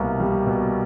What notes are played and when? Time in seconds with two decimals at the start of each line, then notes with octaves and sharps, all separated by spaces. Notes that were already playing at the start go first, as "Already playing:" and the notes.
Already playing: C2 B2 A#3
0.20 G3
0.46 B2